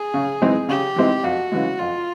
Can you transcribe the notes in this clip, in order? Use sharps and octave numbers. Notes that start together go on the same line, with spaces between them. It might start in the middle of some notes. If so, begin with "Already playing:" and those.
Already playing: G#4
C#3
E3 G#3 C4 D#4
C#3 G4
E3 G#3 C4 D#4
F2 F#4
C#3 E3 G#3
F2 F4